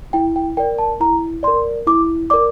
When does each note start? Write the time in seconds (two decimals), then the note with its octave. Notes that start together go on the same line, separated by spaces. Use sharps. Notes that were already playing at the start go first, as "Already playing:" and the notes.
0.13 E4 G5
0.36 G5
0.57 A#4 D5 G5
0.78 A5
1.00 E4 A#5
1.43 A#4 D5 C6
1.87 E4 D6
2.30 A#4 D5 D6